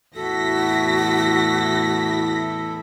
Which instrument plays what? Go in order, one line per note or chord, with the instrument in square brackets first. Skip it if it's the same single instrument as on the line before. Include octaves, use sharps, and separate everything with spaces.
[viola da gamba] E2 A2 E4 [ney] F#4 [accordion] A4 [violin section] A#6 B6